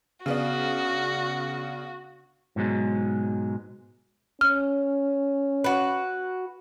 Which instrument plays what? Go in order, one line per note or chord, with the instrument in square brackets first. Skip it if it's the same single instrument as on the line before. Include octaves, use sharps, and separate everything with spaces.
[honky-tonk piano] C#3 B3 D4 [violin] F#4
[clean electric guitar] G#2 B2 F#3 G#3
[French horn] C#4 [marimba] F6
[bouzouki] F#4 B4